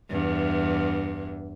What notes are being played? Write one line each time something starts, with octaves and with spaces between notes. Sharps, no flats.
E2 G2